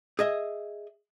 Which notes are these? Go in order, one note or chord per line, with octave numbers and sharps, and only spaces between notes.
G#4 D#5 E5